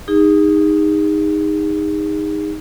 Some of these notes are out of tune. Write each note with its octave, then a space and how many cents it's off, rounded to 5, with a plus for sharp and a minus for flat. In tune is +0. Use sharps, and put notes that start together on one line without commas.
D#4 +0 G#4 -40